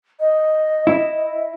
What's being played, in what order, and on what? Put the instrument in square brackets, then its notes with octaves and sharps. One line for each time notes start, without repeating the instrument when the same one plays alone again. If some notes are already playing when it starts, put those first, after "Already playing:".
[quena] D#5
[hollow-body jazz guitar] E4